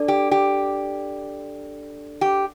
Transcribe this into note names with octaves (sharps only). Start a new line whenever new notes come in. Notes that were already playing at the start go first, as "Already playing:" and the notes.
Already playing: D4 A4 D5
G4
G4
G4